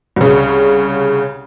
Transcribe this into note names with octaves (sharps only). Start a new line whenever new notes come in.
C2 C#3